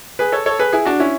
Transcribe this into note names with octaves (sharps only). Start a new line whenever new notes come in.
G#4 B4
A4 C#5
A4 C#5
G#4 B4
E4 G#4
D4 F#4
C#4 E4